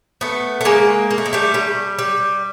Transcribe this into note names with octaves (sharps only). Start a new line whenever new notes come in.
A3 B3
A3
G#3 A#3
A#3
A3
G#3
G3 A3
G3
G3